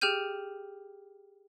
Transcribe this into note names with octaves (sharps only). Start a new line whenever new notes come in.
G4 G#4 G5 F6 G6 D#7